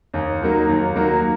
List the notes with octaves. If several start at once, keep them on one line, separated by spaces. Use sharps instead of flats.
D#2
D#3 F#3 A#3
D#2
D#3 F#3 A#3